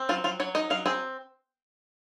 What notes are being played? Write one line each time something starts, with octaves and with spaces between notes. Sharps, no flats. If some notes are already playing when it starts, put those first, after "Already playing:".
Already playing: C4
F#3 F4
F#3 F4
F#3 C#5
D#4 D#5
F#3 F5
C4 G#4